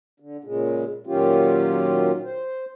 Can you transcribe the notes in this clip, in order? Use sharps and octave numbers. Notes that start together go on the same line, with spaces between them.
D3
A#2 C#3 G#3
A#2 D#3 F#3 C#4 F4 G4
C5